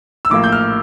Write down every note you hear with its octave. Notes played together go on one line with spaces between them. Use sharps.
E6
A#1 A2 F3 A#3 D6
G6
F6